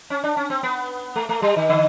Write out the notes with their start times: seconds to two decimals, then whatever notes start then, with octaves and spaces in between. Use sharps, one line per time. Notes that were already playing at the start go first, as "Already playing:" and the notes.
0.10 C#4
0.24 D4
0.37 C#4
0.50 C4
0.63 B3
1.16 A3
1.29 A3
1.42 G3
1.56 D#3
1.69 D3